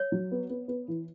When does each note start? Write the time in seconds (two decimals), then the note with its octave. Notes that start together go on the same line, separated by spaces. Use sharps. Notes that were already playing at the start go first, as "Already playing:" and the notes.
Already playing: C#5
0.12 F#3
0.32 B3
0.50 B3
0.68 B3
0.88 E3